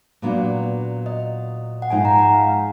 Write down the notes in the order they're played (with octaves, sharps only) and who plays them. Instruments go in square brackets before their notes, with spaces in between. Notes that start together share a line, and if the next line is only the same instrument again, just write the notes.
[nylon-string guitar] A#2 F#3 B3 D4
[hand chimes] D#5
F#5
[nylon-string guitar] G#2 F3 G#3 D#4 [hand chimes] G#5
[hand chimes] A#5
F#5
F5